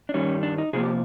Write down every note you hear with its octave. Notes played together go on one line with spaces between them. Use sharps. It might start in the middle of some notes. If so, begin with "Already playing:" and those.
D4
G2 D#3 G3 C#4
D4
D#4
C3 F3 A#3 G#4
G4